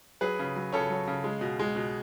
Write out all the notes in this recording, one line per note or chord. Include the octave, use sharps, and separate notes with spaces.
F#3 G#4 B4
C#3
F#3
C#3 A4 C#5
F#3
C#3
G#3
B2
G#3
B2